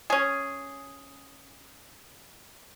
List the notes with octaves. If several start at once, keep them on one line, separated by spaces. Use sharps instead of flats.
C#4 G#4